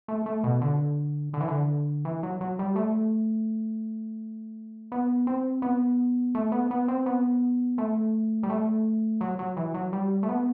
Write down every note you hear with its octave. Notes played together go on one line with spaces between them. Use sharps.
A3
A3
B2
D3
D3
E3
D3
E3
F#3
F#3
G3
A3
B3
C4
B3
A3
B3
B3
C4
B3
A3
G3
A3
F#3
F#3
E3
F#3
G3
A3
B3